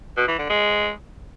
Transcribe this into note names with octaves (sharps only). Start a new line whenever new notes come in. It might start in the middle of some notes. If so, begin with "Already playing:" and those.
B2
E3
D3
G#3